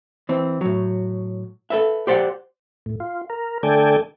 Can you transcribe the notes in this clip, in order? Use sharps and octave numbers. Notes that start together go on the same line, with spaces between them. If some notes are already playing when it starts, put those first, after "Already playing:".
E3 C4
A2 F#3
A4 B4 E5
G4 C5 D5 F5 F#5
A2
F4
A#4
D3 A3 A4 D5 G5 G#5